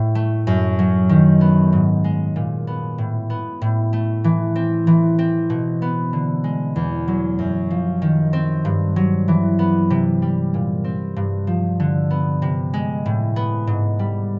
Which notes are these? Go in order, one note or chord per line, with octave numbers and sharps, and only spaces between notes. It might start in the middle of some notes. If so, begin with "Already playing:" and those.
Already playing: A2
A3
F#2
F#3
D#3
B3
G#2
G#3
A#2
B3
A2
B3
A2
A3
E3
C4
E3
C4
B2
B3
D3
G#3
E2
F#3
F#2
F3
D#3
C4
G2
F#3
E3
B3
C3
G3
A#2
C4
G2
F3
D3
B3
C3
G#3
A2
B3
G#2
G3